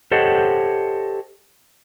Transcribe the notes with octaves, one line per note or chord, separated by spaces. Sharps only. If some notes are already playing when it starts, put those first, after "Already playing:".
G4 A4 C5 C#5 D#5 F#5